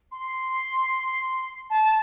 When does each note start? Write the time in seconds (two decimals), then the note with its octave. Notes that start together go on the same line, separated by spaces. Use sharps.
0.12 C6
1.70 A5